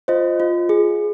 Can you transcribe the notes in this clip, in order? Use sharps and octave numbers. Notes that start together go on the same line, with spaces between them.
F4 C5 D#5
F4
G#4